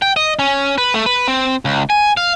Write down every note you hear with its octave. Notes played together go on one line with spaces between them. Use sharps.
G5
D#5
C#4
B4
A3
B4
C4
C#2
G#5
F5